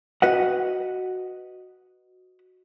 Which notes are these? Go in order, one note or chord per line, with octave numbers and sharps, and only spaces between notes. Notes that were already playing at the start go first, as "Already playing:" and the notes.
F#4 B4 D#5 F#5